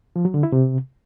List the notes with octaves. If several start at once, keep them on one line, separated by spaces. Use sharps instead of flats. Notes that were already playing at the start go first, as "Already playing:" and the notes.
F3
F#3
D3
E4
C3